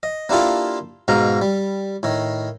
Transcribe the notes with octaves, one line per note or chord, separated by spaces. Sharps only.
D#5
A#3 D4 E4 F4 G4 A4
G#2 B2 F5 A#5
G3
A2 D#3